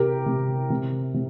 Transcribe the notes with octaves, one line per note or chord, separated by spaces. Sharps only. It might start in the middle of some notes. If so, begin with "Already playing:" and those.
Already playing: C3 G4 A#4
C3
C3
C3